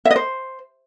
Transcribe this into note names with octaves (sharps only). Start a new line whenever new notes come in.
E5
D#5
C5